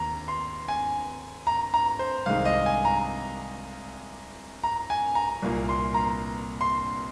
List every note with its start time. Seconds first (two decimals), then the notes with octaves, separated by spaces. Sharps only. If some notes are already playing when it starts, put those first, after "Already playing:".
Already playing: D#2 A#5
0.28 C6
0.68 G#5
1.47 A#5
1.74 A#5
1.99 C5
2.26 C2 C3 D#3 G#3 F5
2.45 D#5
2.66 G#5
2.85 A#5
4.64 A#5
4.90 G#5
5.15 A#5
5.42 C2 A#2 A#3
5.69 C6
5.94 A#5
6.61 C6